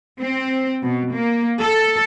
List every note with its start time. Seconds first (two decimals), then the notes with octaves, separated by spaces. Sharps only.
0.21 C4
0.83 B2
1.14 A#3
1.61 A4